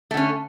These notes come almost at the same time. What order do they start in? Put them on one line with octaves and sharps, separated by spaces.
A3 D3 C#4